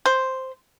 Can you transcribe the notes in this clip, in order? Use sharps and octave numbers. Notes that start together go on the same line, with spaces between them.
C5